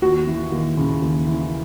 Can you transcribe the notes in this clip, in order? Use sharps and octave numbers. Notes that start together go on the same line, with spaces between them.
D#2 F#4
E3
D#2
C#3
D#2
E3